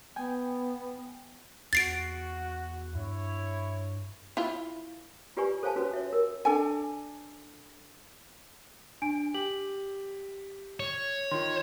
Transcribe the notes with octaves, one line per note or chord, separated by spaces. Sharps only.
B3 G5 G#5
E2 F#4 A6 C7 D7
G2 E4 C#5
E4 F4
F4 G4 B4 D5 G#5 C#6
A4 C5 C#5 F5 G#5 A5
C#4 F#4 B4
C#5 E5
A#4
D4 A4 G#5
D4 G#5 D7
G4 F#7
C#5
D#3 F4 C6